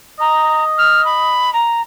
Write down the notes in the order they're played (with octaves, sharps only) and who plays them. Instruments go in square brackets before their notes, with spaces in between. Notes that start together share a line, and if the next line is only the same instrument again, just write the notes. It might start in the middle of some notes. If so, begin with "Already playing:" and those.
[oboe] D#5 [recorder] A#5
[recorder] F6
B5
A#5